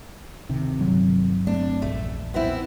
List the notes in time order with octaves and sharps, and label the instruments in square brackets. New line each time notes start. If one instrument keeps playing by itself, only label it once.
[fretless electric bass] D2 C3 D#3
[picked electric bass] G1 F#3
[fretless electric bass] A3 C4 [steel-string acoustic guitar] D4
[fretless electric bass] A#1 E2 [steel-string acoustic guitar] A3
[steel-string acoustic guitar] B3 C4 E4